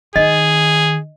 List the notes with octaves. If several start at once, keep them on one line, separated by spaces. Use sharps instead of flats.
D#3 G#4 D#5